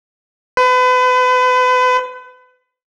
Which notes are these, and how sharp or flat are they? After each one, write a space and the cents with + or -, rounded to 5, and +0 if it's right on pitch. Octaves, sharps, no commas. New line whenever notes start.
B4 +35